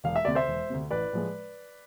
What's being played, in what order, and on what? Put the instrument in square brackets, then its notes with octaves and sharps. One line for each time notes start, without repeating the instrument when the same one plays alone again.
[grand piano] E1 F5
E5
D2 C3 D5
C5 E5
E1
D2 C3
A1 B4 D5
A2 F3 G#3